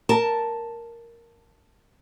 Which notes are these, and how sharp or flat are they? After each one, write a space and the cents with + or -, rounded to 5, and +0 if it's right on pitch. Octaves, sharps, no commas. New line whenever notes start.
A#4 +0 A5 +0